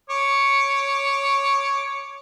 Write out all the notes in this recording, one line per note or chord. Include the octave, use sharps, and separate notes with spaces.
C#5 D6